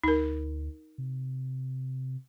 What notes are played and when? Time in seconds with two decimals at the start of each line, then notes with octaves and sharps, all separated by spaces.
0.04 D2 D#4 A#4
0.98 C3